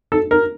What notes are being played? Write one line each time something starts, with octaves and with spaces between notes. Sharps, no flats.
A4
A#4